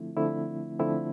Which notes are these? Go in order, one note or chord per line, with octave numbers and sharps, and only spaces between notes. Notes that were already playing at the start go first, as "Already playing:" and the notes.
Already playing: D3 F3 A3 C4 E4
D3 F3 A3 C4 E4
D3 F3 A3 C4 E4